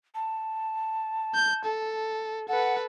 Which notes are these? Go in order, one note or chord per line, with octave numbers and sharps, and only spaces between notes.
A5
G6
A4
A4 B4 F#5